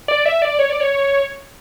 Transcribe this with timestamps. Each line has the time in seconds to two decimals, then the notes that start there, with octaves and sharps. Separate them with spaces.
0.08 D5
0.26 E5
0.42 D5
0.59 C#5
0.70 D5
0.80 C#5